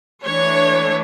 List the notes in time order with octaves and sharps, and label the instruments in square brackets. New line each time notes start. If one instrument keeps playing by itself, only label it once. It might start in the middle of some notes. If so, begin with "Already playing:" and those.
[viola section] E3 A3 D4 C#5